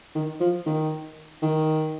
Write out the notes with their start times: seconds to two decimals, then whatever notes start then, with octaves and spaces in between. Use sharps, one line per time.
0.15 D#3
0.40 F3
0.66 D#3
1.42 D#3